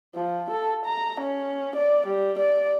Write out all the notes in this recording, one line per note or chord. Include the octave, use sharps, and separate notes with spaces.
F3
A4
A#5
C#4
D5
G3
D5